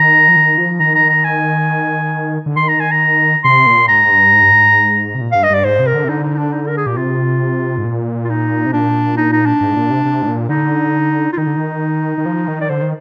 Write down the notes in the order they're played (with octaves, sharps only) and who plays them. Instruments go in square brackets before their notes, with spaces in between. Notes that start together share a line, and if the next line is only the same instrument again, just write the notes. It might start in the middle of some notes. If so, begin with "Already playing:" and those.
Already playing: [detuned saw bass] D#3 [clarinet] A#5
[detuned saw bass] F3
D#3
F3
[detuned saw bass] D#3 [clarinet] A#5
[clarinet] A#5
A#5
G#5
[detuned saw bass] D3
[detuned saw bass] D#3 [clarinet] C6
[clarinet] A#5
G#5
A#5
[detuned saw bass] C3 [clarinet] C6
[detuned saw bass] A#2
[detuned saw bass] G#2 [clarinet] A#5
[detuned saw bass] G2
G#2
G2
G#2
C3
A#2
[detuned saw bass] G2 [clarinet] F5
[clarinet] D#5
[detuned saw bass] G2 [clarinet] D5
[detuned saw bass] G#2 [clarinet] C5
[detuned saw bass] C3
[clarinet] A#4
[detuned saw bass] D3
C3
[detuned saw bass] D3 [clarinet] D#4
[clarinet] D#4
D#4
D4
D#4
A#4
G#4
[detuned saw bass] A#2 [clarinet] G4
[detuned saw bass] C3 [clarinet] F4
[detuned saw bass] G#2
A#2
[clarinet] F4
D#4
[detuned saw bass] C3
[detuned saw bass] A#2 [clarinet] D4
[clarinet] D#4
D#4
D4
[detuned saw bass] G#2
A#2
C3
C3
G#2
A#2
[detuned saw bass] D3 [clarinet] D#4
[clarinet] F4
[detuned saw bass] D#3 [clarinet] D#4
[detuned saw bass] D3
D#3
D#3
F3
D#3
[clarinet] D5
[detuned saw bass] D3 [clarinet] C5
[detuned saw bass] D#3